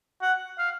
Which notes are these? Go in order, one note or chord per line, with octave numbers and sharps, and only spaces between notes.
F#5
F5